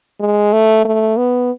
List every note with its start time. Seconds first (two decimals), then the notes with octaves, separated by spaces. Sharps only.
0.20 G#3
0.53 A3
0.85 A3
1.17 B3